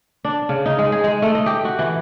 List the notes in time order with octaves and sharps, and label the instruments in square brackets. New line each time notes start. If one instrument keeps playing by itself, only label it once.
[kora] D4
C#3
D#4
G#3
G#4
G#3
A3
D#5
G4
F#4
E3